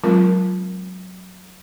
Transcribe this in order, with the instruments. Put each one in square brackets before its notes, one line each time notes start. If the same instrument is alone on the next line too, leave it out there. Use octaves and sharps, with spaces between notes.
[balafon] F#3 G#3 C4 F4 A#4